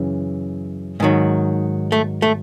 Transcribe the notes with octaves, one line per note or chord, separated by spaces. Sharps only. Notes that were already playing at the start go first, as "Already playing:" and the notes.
Already playing: F#2 C#3 E3
G#2 D#3 F#3
A3
A3